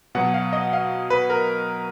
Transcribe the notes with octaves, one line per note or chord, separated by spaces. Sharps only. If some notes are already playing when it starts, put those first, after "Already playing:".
B2 F#3 F#5
F5
D#5
F5
B4
A#4